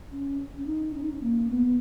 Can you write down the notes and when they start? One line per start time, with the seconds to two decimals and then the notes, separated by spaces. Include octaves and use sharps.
0.12 C#4
0.58 C#4
0.66 D#4
0.95 C#4
1.03 D#4
1.12 C#4
1.23 A#3
1.50 B3